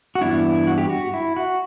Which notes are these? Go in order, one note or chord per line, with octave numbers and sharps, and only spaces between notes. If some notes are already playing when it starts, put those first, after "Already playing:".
F#4
G2 E3 B3 D4 E4
F#4
G4
F#4
E4
F#4